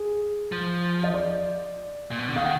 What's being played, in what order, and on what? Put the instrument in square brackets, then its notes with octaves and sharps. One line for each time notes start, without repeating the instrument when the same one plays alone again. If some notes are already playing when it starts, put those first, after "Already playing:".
Already playing: [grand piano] G#4
[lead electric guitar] F3
[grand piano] D#5
D5
[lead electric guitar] A#2
B2
D3
[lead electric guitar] D#3 [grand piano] F5
[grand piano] F#5